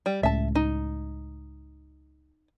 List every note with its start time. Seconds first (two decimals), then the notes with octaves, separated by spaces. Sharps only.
0.06 G3
0.23 C#2 A2 C#3 E5 A5
0.55 D#4